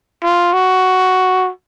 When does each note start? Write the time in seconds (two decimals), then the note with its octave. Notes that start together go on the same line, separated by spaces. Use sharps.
0.23 F4
0.53 F#4